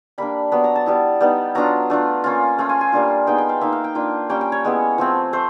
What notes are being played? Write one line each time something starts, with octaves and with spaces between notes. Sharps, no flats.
G3 A#3 D4 B5
F#3 B3 D4 B5
A#5
A5
G3 B3 E4
G3 B3 D#4
F#3 B3 D4 F4 A#5
A3 D4 F4
A#3 C#4 F4
A3 C#4 F4
G#5
G#5
G3 A#3 D4 F4
G#3 B3 D#4 G5
G5
F5
A#3 D#4 E5
F5
G5
A#3 D4 F4
G3 A#3 C#4 G5
G5
C#5
G#3 B3 E4
F3 A3 C4
A3 C5